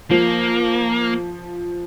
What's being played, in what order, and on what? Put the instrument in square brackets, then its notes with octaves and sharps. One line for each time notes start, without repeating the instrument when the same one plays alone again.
[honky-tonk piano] F3 [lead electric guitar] A#3